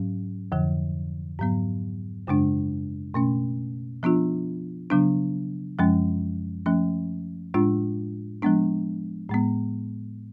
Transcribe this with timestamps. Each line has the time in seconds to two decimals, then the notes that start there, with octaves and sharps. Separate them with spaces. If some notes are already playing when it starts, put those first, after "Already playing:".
Already playing: G#2 F#3 C#4
0.52 F2 D3 F3
1.39 G#2 F#3 B3
2.27 F#2 C#3 G#3 D4
3.14 B2 A3 C#4
4.03 F3 B3 D4 F4
4.90 C#3 F#3 B3 D4
5.79 F#2 F3 G#3 C#4
6.66 F3 A3 C#4
7.54 A2 G#3 D4 F4
8.42 F3 G#3 B3 D4
9.29 A2 G#3 B3